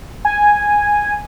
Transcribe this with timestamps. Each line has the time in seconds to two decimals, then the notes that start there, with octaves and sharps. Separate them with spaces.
0.25 G#5